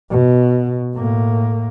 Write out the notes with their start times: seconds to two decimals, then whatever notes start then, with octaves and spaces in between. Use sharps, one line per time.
0.10 B2
0.95 A2 A#3